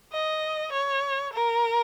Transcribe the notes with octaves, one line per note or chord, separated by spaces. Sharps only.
D#5
C#5
A#4